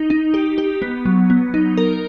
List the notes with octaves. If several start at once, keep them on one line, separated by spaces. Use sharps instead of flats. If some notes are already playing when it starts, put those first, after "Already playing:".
Already playing: D#4
D#4
G4
G4
B3
F#3
B3
D#4
A#4